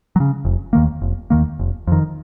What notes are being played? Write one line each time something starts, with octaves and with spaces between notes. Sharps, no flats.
F#3
C#3
F1
D#2 D#3 A#3
F1
D#2 D#3 A#3
F1
F2 D#3